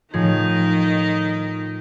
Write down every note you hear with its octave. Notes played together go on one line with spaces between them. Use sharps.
A2 D#3 F3 D#4 G#4